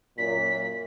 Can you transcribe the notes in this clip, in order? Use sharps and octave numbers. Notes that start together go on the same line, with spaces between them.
F#2 A#2 B6